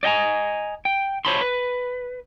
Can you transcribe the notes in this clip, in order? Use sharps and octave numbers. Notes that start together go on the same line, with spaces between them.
D5 D#5 G5 G#5 A#5
G5
C5 C#5 A5 B5 C6
B4